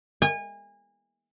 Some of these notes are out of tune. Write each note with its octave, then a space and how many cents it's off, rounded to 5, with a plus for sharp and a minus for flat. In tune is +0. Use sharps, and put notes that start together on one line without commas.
G#5 -30